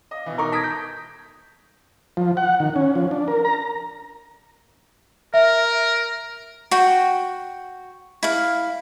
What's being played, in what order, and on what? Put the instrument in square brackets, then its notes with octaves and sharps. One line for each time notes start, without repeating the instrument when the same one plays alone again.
[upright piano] D#5 F5
B2 E3
[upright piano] B2 D#4 A#4 [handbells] A#5 C#6 D6
[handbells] A5 D#6 G#6 [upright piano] A#6 B6 D7
[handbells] G6
[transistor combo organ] F3
F#5
D#3
C#4
F3
D4
A#4
A#5
[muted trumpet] A#4 [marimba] E5
[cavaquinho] F#4 G5
E4 F5